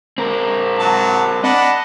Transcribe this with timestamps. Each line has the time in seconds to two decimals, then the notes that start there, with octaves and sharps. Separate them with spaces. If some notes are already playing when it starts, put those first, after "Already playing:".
0.18 C4 A#4
0.79 F#3 A5
1.44 D4 D#5 F#5 B5